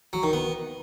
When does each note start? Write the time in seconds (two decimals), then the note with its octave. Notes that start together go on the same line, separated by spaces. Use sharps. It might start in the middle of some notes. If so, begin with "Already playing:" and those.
0.13 F#3
0.23 D#3
0.33 B3